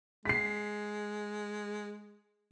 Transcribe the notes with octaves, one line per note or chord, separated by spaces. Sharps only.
G#3 B6 C7